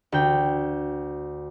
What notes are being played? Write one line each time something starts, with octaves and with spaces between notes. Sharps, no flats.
D2 G5